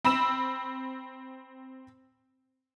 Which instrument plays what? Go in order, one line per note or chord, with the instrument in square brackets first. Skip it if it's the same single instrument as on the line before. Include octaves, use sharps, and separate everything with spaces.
[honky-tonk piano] C4 B5 E6 E7